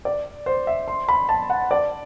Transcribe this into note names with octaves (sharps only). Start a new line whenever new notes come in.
D5
C5
E5
C6
B5
A5
F#5
D5